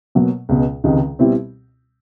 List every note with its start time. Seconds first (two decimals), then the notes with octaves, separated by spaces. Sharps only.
0.15 B2 F#3 A#3
0.49 C#2 B2 G#3
0.84 C#2 C3 D#3 G#3
1.19 B2 G3 C4 E4 G4